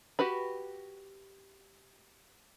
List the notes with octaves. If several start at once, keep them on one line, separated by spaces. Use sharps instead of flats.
F#4 G4 B4 B5